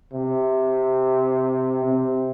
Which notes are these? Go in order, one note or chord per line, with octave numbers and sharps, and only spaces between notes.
C3
C3